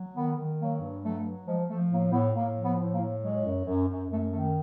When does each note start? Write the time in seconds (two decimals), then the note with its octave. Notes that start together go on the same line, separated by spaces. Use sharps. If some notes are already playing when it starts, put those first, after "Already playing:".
Already playing: F#3
0.16 D#3 B3
0.38 D#3
0.60 F#3 A#3
0.81 G2
1.03 F#3 A3
1.24 F#3
1.47 F3 G#3
1.69 F3 A3
1.90 A2 A#3
2.12 A2 B3
2.34 A2 A#3
2.57 F3
2.63 B3
2.78 A2
2.92 A#3
3.01 A2
3.21 F#3 G#3
3.43 F#2
3.65 F#2
3.88 F#2
4.09 F#2 A3
4.31 D#3 A3